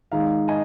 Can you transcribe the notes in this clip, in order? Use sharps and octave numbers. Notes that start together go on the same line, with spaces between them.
D#3 G#3 D#4 F5 A#5
D#5 G#5